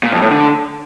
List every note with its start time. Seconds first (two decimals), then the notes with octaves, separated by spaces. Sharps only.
0.03 A#2
0.12 F2
0.21 A2
0.31 D3